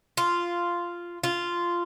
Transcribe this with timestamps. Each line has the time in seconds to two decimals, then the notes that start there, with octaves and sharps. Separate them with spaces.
0.17 F4
1.24 F4